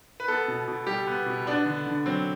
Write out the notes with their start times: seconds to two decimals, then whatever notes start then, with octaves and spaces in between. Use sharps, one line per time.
0.20 B4
0.28 B3 A4
0.48 B2
0.68 B2
0.87 G3 G4
1.07 B3
1.26 B2
1.46 B3 D4
1.66 D3
1.86 D3
2.06 F#3 C4